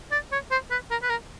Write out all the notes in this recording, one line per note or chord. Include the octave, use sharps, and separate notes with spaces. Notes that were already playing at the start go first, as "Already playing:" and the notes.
D5
C#5
C5
B4
A#4
B4
A#4